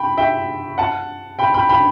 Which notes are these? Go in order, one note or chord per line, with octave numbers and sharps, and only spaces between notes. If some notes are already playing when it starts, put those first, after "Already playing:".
Already playing: G5 B5
E5 G5
F#5 A5
G5 B5
G5 B5
G5 B5